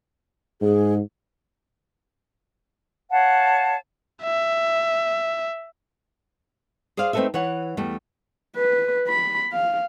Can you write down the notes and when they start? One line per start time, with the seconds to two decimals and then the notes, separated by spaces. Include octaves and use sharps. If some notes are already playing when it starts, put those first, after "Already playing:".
0.61 G#2 G#4
3.11 C#5 F5 F#5 A5
4.23 E5
6.97 G#4 C5 D5 F5
7.13 A3 C4 D#4 A4 B4 E5
7.34 E3 C#5 F#5
7.77 E2 G3 A3
8.56 B4
9.08 B5
9.53 F5